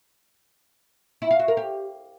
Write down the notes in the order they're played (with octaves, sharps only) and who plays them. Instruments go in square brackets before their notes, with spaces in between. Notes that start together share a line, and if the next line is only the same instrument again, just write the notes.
[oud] E4
F5
F#4
A#4
G4